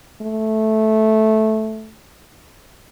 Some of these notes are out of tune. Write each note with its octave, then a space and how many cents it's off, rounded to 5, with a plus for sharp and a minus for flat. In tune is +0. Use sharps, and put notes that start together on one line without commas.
A3 -10